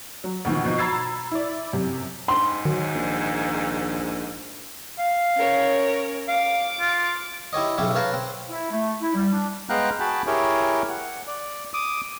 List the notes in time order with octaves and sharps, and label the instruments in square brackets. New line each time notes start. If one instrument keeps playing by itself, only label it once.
[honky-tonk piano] F#3
D2 B2 D#3 F3
B2 F3 D#4
A#5 B5 E6 G#6 A6 C7
E4 D5
F#2 C3
[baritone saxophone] G#2 [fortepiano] C6
[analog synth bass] D#3 [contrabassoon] F#3
[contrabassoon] A#1
[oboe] F5
[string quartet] C#4 A#4 C#5
[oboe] F5 [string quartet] D6
[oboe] F4
[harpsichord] E4 G4 C#5 D#5
B1 C#3 G4 C#5 E5
B4 C#5 F5 A5 A#5
C4
[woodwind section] E4
A3
E4
G3
D4
[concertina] G#3 B3 F5 G5 A#5 F#6
F#4 G#4 G5 A5 B5
E4 G4 G#4 A#4 C#5
F#5
D5
D6 D#6